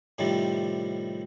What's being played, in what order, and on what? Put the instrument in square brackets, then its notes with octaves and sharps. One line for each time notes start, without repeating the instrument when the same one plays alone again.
[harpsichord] A2 C3 D#3 F3 G3